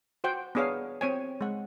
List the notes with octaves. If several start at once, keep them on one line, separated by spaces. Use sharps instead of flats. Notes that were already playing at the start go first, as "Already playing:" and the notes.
F#4 C5 F#5 G5
B3 D4 G#4 C#5 F5
C4 C#5 G#5
G#3 F#5